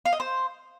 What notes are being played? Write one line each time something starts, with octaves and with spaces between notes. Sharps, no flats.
F5
D#5
C5